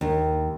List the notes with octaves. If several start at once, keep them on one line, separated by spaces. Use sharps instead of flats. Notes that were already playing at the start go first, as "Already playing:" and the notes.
D#2